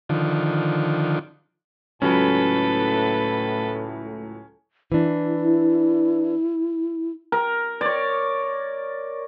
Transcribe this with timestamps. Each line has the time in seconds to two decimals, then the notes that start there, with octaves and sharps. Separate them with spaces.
0.09 D3 D#3 F3
2.02 C#2 A2 F#3 C#4 A4 B4
4.92 E3 D4 E4
7.32 A#4
7.81 C#5 D5